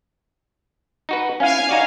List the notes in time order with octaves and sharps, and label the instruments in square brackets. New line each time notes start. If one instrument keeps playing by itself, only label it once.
[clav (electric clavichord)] D#4 F#4 B4
[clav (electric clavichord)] C#4 E4 [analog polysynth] F5 G#5
[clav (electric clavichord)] D#4 F#4 D5